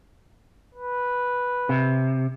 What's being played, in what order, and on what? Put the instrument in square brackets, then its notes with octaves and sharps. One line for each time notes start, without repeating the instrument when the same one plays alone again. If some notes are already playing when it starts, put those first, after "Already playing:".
[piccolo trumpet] B4
[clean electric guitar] C3